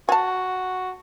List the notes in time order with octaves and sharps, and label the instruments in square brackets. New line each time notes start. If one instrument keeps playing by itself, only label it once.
[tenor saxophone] F#4 [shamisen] G#5 A5